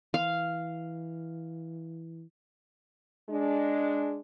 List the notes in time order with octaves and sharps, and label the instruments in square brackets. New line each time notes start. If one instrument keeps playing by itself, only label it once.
[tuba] E3 [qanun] F5
[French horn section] G#3 D4